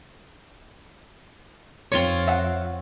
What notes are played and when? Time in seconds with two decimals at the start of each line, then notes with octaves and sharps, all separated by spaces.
1.92 F2 C4 F4 C#5
2.28 E5 F#5